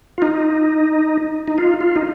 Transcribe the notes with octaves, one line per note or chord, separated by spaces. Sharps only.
F4
D#4
D#4
F4
F4
D#4